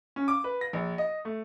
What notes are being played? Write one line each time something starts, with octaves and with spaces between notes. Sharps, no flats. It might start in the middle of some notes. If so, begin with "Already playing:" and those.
C#4
D6
B4
A#6
A#1
D#5
A3